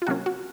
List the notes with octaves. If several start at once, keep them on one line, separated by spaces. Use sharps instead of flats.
F4
C3 F#3 A#3 C#4 F#4
F#4